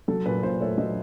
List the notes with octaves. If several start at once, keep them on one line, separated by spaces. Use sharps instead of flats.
F#3 A4
A#2 B4
A#2 C5
A3 C#5
F#3 D#5